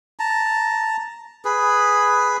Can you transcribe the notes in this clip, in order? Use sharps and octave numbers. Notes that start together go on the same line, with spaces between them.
A5 A#5
G#4 B4